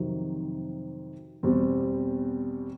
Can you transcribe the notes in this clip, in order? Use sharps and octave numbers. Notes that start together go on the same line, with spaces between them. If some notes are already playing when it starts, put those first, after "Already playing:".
Already playing: F2 C3 D#3 F#3
E2 B2 G3 C4